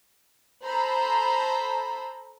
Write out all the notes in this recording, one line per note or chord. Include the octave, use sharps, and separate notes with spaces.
A4 C5 A#5 B5